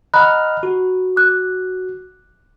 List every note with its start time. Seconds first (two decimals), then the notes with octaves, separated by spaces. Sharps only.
0.14 D#5 F#5 A#5 B5 F6 F#6
0.63 F#4
1.16 D6 F#6